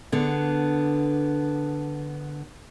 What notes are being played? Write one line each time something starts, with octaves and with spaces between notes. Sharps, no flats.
D3 B3 G#4